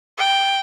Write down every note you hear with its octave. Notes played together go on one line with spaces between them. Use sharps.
G5